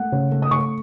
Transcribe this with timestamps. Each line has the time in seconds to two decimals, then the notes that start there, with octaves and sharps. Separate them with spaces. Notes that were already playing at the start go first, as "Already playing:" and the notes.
Already playing: A3 F#5
0.12 C#3
0.32 A3
0.42 D#6
0.51 A3 C#6